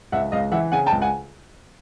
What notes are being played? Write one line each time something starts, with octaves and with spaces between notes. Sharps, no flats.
C#2 E5 F#5
C#2 D#5 F5
E3 E5 F#5
C#3 F#5 G#5
G5 A5
C#2
F#5 G#5